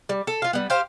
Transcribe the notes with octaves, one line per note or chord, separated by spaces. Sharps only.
G3
A4
F4 F5
G3 B3
G4 C5 F5